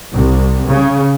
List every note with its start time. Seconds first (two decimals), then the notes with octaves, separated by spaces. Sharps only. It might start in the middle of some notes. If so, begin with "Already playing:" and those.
0.12 C2
0.70 C#3